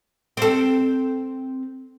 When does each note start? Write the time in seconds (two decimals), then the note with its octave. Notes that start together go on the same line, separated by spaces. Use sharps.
0.37 C4 A4